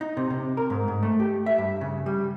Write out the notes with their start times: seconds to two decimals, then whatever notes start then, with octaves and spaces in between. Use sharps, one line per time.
0.01 D#4
0.17 C3
0.30 C3
0.57 A#4
0.70 G#2
0.88 G#2
1.03 A3
1.20 G4
1.46 E5
1.58 G2
1.81 C#3
2.06 G3